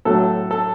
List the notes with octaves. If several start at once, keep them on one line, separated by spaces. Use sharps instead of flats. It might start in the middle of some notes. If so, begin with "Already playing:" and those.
A2 F#3 A3 A4
A4